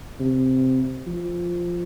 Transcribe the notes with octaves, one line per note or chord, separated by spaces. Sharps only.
C3
F3